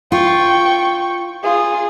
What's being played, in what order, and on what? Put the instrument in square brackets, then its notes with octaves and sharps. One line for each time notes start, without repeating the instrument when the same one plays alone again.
[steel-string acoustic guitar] F4 [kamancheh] G5 C#6
[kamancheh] F4 G#4